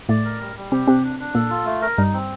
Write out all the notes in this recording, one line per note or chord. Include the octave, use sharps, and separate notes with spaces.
A2 A3 D5
A#4
G3
G3
C3 C4 G4
C3 C4 D4
D4
D4
A#2 A#3 A4
F4
A3
A#4
G2 G3 D#4
C4